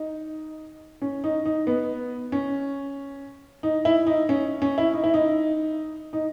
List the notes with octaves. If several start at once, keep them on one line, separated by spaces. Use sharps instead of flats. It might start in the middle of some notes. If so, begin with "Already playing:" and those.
Already playing: D#4
C#4
D#4
D#4
B3
C#4
D#4
E4
D#4
C#4
C#4
E4
D#4
E4
D#4
D#4